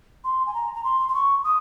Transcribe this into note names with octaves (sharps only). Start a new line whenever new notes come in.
C6
G#5
A#5
A#5
C6
C6
C#6
D#6